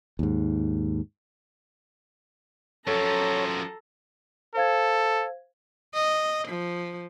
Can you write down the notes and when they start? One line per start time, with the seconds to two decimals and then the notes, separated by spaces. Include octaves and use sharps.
0.19 D#2 G#2
2.87 F#2 F3 A4 C#5 A#5
4.55 A4 C5 F5 G#6
5.94 D#5
6.48 F3